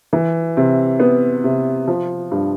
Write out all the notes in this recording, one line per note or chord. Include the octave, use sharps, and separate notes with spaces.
E3
C3
B3
C3
F3
G2